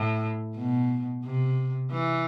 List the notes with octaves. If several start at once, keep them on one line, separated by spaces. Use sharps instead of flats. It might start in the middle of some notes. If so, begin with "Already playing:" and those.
Already playing: A2
B2
C3
E3